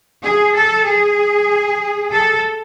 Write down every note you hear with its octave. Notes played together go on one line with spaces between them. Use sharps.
G#4
A4
G#4
A4